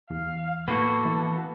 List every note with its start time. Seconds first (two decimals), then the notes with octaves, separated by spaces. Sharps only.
0.10 E2 F5
0.68 A2 A#3 B3 F#4 A4
1.05 E3